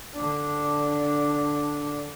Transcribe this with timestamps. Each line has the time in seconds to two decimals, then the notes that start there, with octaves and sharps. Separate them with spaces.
0.15 D3 D4